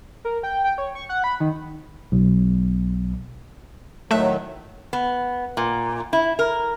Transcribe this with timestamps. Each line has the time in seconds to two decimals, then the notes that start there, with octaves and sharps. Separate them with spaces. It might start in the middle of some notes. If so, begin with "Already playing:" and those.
0.25 A#4
0.43 G5
0.64 G5
0.78 C#5
0.95 C#6
1.09 F#5
1.24 B5
1.40 D#3
2.12 B1
4.11 A2 D#3 F#3 A3 E5 F#6
4.93 B3
5.57 A#2
6.13 E4
6.39 A#4